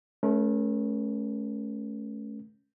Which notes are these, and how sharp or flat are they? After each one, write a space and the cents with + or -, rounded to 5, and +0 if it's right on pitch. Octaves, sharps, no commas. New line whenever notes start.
A3 -30 C#4 +0 A#4 +40